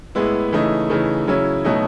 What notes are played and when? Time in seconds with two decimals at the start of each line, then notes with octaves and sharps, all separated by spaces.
0.15 A2 G#3 B3 E4
0.52 C#3 E3 A3 D#4
0.90 C#3 E3 A3 D#4
1.27 C#3 F#3 C#4 E4
1.65 B2 F#3 A3 D#4